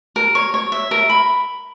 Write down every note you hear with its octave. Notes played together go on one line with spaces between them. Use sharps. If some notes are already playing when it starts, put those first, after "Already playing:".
A#4
C#5
C#5
E5
A#4
B5